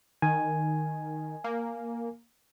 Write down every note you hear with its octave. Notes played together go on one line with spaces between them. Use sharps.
D#3 G#5
A#3